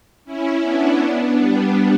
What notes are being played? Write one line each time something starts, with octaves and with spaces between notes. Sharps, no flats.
C#4 E4
B3 D4
G3 B3